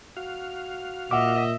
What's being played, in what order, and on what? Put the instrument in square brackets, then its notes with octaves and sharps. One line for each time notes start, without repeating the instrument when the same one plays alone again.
[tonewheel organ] F#4 F5
[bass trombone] A#2 [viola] D#5 E5 [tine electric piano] F#5 D6